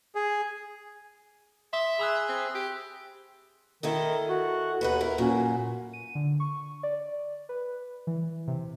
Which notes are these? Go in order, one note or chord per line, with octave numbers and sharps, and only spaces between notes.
G#4
E5 C6 D#6 G7
G#4 B5 E6 F#6
C4
G4
D#3 E4 A4 D#5
F#4
D#2 B3 D#4 B4
E4 A#4
F#2 A#2 C#4 F#4
D#7
D3
C#6
D5
B4
E3
C3